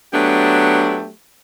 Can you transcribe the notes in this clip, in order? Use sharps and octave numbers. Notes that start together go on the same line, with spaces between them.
F#3 A3 B3 D4 G4